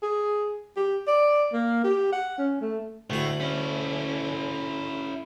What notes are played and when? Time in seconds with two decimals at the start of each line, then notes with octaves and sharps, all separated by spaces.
0.02 G#4
0.77 G4
1.08 D5
1.53 A#3
1.84 G4
2.12 F#5
2.38 C#4
2.61 A3
3.10 D2 A2 F#4
3.40 C#4 E4